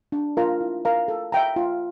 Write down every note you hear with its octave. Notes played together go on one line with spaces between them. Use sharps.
D4
F4 A#4 F5 A#5
E4
A#4 F5 A#5
A4
E5 G5 A#5
F4